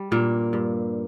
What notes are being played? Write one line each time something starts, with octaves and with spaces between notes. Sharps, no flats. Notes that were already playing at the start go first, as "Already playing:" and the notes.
Already playing: G3
G2 A#2 A#3
G2